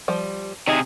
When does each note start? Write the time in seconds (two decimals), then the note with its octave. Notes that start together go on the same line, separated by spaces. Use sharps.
0.08 F3 G3
0.67 C3 D#4 G#4